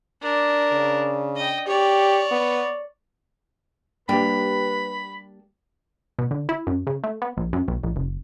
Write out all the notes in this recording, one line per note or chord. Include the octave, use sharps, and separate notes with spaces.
D4 A#4
C#3
D#5 G5
G4 C#5 D5
B3
G3 A#3 D4 G4 B4 B5
B2
D3
E4
F#2
C#3
A3
B3
A#1
F#2
B1
A#1
F#1